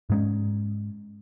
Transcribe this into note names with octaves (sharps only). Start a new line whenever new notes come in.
G#2 G#3 C#4